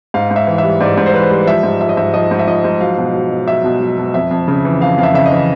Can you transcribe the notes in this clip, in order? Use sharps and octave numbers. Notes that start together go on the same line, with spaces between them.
G#2 F5
G#2
E5
E3
E5
G3
G#2 D5
G#2
C5
E3 B4
G3
F3 E5
G#2
F3 E5
D#5
G#2 E5
F3 D#5
G#2
E5
F3 D#5
G#2
F#3 F5
B2
F#3
B2
F#3 E5
B2
F#3
B2
F2 E5
F2
C#3
E3
F2 F5
F2 F5
E5
C#3 E5
D#5
E3